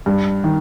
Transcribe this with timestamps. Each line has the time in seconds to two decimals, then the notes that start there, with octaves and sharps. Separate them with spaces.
0.06 G2
0.44 D#3